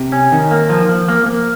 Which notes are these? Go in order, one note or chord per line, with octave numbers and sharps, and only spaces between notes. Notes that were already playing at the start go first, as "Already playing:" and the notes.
Already playing: C3
C#4
D#3
A#3
F3
F3
A#3
A#3